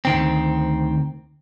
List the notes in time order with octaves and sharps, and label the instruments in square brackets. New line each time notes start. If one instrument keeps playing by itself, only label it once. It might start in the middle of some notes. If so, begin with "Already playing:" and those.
[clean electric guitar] D2 D#3 C4